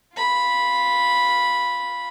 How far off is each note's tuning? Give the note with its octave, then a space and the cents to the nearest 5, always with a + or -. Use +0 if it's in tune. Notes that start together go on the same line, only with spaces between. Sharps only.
F4 +0 B5 -5